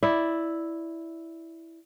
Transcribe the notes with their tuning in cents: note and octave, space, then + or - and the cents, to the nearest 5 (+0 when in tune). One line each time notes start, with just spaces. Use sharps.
E4 +0 D5 +0